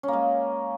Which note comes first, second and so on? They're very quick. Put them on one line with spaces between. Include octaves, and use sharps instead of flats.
C#4 A#3 G#3